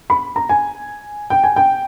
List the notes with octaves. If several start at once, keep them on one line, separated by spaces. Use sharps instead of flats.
B5
A#5
G#5
G5
G#5
G5